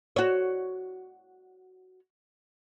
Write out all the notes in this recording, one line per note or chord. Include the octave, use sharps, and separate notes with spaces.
F#4 C#5